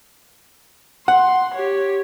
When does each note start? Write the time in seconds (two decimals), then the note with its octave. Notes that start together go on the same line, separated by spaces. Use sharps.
1.08 F#5 C6
1.55 G4 C#5